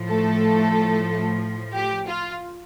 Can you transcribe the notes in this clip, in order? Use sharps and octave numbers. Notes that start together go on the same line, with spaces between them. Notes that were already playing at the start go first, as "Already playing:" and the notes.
Already playing: A2 F3
A3 A4
G4
F4